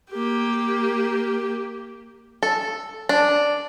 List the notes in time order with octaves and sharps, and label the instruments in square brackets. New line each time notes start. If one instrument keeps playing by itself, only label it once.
[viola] A#3 G4
[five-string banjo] A4
D4